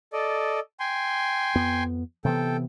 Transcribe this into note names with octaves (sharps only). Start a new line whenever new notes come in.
A4 D5 D#5
G5 G#5 C6
F2 B3
C3 E3 B3 A4 G5